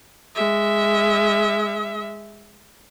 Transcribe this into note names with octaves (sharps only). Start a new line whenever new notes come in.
G#3 E5